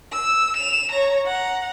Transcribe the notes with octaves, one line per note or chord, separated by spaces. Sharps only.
E6
E7 F7
C#5 A#5
F#5 A#5